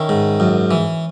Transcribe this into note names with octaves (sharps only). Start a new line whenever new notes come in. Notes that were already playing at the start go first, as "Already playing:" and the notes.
Already playing: D#3 C#4 E4
G#2
F#2
E3